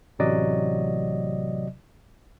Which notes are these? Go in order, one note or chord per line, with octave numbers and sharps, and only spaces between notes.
A1 C3 F#3 D5 D#5